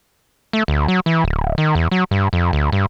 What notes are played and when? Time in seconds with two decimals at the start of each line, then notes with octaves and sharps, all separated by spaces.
0.53 A3
0.68 D2
0.88 F#3
1.06 E3
1.24 D1
1.58 D#3
1.75 E2
1.91 F#3
2.11 G2
2.33 F2
2.53 D2
2.72 G2